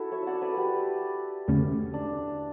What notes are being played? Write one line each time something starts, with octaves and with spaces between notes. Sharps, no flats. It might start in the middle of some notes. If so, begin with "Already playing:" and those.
Already playing: E4 F#4 A4
C#5 E5
D5 E5 F#5
B4 D5
G4 B4
E2 D3 A3 C#4
D4